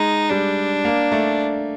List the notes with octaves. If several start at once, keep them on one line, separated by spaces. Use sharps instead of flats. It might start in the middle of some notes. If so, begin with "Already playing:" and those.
Already playing: G#3 D#4
G3 D4
A#3
A3